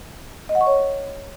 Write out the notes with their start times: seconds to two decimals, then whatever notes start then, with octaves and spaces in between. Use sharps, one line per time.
0.49 D#5
0.55 F#5
0.61 C#6
0.67 C#5